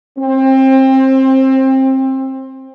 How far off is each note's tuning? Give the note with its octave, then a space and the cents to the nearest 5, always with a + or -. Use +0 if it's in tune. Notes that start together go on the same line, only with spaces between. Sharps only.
C4 +25